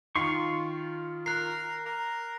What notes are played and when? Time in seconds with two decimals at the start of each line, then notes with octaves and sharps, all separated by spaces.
0.16 D#3 F4 C6 C#6
1.26 A#4 F#6 C7
1.86 A#4